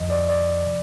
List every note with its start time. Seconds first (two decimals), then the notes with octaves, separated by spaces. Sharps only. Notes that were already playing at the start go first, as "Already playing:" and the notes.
Already playing: F2 D3 F3 D#5
0.10 D5
0.29 D5
0.66 C3 F3